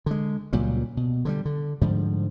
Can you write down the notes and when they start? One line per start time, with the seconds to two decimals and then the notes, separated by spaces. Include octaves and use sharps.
0.06 D3 G#3
0.53 C#2 A#2 F#3 G3
0.97 B2
1.25 D3 F#3 G3
1.45 D3
1.81 G#2 D3 F3 G3